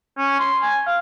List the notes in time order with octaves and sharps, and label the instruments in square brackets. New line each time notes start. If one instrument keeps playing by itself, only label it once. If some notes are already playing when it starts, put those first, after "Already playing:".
[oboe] C#4
C6
G#5
F5